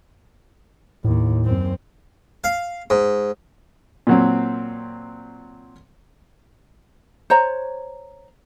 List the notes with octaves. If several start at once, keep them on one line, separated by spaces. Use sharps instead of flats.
D#2 A2
F#2 C4
F5
G#2
A#2 F#3 C4
C5 C#5 A#5